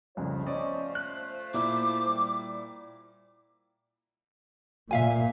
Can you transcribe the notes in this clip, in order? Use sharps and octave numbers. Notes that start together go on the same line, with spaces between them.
C2 F2 C#3 A3 F4 C5
C#4 D5 D#5
F#6
A#2 E4 D6
G3
A#2 E5 F5 G#5